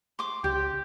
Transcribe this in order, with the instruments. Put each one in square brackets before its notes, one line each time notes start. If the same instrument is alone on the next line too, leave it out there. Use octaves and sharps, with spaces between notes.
[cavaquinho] C6 D6
[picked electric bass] C#2 [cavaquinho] G4 [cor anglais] G5